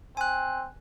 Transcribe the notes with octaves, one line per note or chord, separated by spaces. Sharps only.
C4 G#5 F#6